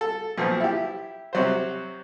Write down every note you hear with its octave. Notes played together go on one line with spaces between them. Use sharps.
A4
B1 A#2 F3
E4 G4
C3 F#3 C5